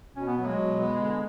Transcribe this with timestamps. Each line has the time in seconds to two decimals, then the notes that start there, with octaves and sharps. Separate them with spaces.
0.16 B2 C#4
0.27 B3
0.38 F#3 B3
0.48 G#3
0.58 B2
0.79 B3
1.00 D3